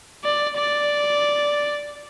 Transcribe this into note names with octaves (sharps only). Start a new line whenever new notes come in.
D5
D5